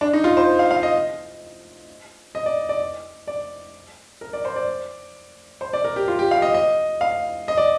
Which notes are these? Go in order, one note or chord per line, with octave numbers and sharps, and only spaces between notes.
D4
D#4
F4
C5
F5
F5
D#5
D#5
D5
D5
D5
A#4
D5
C5
D5
C5
D5
A#4
G4
F4
G4
F5
D#5
D#5
F5
D#5
D5